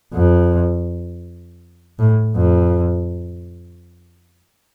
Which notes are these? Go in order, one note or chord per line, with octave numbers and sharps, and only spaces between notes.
F2
A2
F2